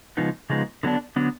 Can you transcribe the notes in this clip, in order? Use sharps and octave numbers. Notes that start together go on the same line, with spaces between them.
C#3 F3 G#3 B3 D#4
C#3 F3 G#3 B3 D#4
D3 F#3 B3 D4
D3 F#3 B3 D4